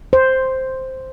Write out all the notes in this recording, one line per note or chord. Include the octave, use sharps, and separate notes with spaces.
C5